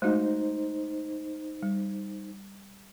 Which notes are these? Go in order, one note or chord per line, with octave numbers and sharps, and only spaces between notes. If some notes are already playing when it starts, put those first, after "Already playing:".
G#3 A3 D#4 F#4 C5
G3